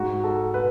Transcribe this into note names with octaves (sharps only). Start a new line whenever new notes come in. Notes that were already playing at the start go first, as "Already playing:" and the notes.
Already playing: G#2 F#4
A4
B4